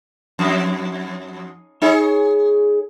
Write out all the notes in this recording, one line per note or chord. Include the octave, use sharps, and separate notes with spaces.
F2
D#4 G#4 C#5